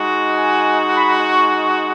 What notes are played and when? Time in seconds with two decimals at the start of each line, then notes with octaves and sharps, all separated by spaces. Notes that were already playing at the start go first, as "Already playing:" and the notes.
Already playing: G#3 D#4 F#4
0.35 G#5
0.94 B5
1.24 C#6
1.54 C#6